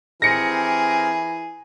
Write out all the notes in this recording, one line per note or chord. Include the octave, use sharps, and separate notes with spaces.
E3 C4 G4 G#4 A#4 A#6 C#7